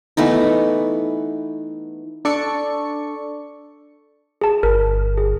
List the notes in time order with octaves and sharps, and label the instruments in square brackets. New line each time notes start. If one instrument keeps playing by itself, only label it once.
[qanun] E3 A3 B3 D#4
[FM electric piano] D4 A4 D5 C#6 C#7
[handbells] G#4 A5
[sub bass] G1 [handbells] A#4
[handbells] G#4